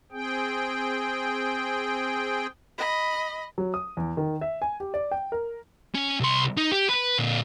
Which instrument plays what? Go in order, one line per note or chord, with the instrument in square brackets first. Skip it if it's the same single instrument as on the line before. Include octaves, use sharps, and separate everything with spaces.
[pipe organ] C4 G#4 G5
[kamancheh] D#5 B5
[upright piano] F#3
D#6
E2
D#3
E5
G#5
G4
D5
G5
A#4
[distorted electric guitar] C#4
C2 C6
D#4
G4
B4
A#2 D3